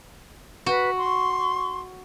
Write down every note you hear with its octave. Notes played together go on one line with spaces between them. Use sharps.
F#4 B4
C6 C#6